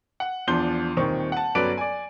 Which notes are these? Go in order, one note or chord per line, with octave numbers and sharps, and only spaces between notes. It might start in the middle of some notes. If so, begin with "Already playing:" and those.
F#5
E2 F3 D4 C6 G6 G7
D#1 D#3 C4 C#6
F#5 A5
G1 F#3 C#4 B4 D5 D7
D5 G#5